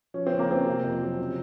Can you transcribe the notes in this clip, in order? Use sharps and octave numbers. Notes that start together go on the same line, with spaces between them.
F3 C#4
C4
C#3
A#3
C#3 C4
C3
F2
F#3
C#3